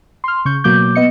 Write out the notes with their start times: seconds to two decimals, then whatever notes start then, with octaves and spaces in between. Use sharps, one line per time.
0.24 C6 F6
0.45 C#3 C#6 G6
0.64 B2 F#3 A#3 D6 G6
0.95 B3 D#5 C#7